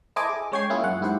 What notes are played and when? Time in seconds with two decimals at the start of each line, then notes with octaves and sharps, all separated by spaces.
0.16 E4 A4 C5 D#5 G#5 D6
0.29 G#4
0.52 G#3 C#4 C#5 G5 G#6 C7
0.70 A#3 C#4 E4 F4 G#4
0.84 F#2 F#5
1.01 G#2 E4 G4 C5 F#5